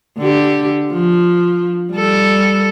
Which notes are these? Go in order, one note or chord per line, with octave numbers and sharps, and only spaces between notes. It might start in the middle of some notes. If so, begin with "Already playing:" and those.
D3 G4
F3
G3 A4